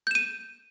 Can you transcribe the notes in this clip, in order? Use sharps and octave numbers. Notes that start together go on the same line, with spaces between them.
G6 D#7 E7